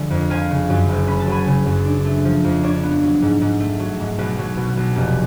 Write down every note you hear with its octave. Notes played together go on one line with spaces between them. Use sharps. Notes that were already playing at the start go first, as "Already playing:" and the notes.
Already playing: D3 F3 G#3
F2
F3 F5 G#5
C#3
F#2
F#1
C#4 B5
A5
F#3 G#5 B5
C#3
F#2
D4
A3
F3
F2
D4 C#5
B3
F#3
G#2
G#2
A3
F#3
G#2
B1 B4
F#3
B2
B1
F1